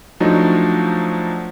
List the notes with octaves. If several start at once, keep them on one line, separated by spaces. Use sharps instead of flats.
F3 F#3 A3 D4 D#4